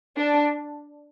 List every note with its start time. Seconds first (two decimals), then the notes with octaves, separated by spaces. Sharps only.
0.17 D4